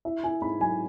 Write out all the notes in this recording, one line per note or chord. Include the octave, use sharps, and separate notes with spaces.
E4 E5
E4 G#5
G#2 B5
F#3 G#5